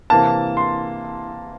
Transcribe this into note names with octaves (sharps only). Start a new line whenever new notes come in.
C3 E3 A#3 A5
C6